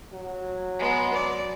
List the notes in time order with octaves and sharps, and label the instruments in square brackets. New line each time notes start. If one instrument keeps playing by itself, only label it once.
[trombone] F#3
[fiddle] G#3 B3
D5